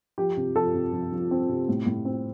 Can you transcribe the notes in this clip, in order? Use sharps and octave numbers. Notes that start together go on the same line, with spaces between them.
F3 G4
C3
F3 A4
C3
F3
F3
C4
C3
A2
A2
C4